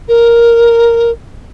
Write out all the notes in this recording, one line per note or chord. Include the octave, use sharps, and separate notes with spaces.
A#4